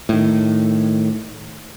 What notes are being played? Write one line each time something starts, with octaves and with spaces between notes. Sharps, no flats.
A2 D#3